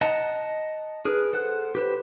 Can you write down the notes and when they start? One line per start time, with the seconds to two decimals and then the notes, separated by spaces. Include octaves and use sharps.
0.01 D#5 F#5 A5 A#5
1.05 G#4 A#4 B4
1.33 A4 C5 F#5 F#6
1.75 G4 B4 C5